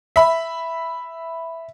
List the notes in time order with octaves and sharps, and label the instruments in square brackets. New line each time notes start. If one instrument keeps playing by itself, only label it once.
[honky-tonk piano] E5 B5